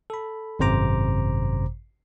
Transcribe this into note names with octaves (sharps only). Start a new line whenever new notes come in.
A4 B5
G#1 F#2 C3 C5 A#5 D6